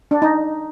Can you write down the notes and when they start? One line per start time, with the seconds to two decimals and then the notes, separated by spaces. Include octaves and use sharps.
0.11 D4
0.22 D#4